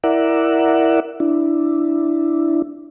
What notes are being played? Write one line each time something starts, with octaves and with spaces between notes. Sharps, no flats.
E4 A#4 D5 E5 F#5
D4 E4